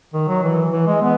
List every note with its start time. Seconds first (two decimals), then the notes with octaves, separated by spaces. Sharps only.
0.14 D#3
0.28 F#3
0.43 E3
0.72 E3
0.87 G#3
1.02 B3